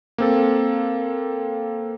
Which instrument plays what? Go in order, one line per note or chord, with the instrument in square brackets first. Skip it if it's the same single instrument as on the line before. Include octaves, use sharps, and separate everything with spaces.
[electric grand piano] A#3 C4 A4